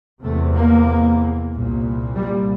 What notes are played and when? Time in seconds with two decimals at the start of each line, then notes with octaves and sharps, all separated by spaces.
0.23 E2 C3 A3
0.55 A#3
1.52 C2 A#2
2.16 G3